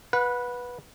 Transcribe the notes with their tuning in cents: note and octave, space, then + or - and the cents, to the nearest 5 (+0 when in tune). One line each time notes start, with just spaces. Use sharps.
B4 -10 F#5 -30